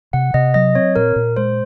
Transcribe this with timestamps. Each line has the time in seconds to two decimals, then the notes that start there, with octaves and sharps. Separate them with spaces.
0.13 C3 F#5
0.34 C3 D#5
0.54 F#3 D#5
0.75 C4 C#5
0.96 A#2 A#4
1.16 A#2
1.36 G#3 C5